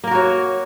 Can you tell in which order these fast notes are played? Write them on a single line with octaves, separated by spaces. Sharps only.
A#3 A#4 F#4 C#5